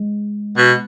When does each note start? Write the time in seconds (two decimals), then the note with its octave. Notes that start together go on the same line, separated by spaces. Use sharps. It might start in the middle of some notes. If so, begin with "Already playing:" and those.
Already playing: G#3
0.57 B2